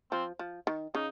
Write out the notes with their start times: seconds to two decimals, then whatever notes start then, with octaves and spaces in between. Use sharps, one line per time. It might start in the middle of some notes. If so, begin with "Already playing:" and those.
0.11 F3 C4
0.39 F3
0.67 D#3
0.95 C#3 D#4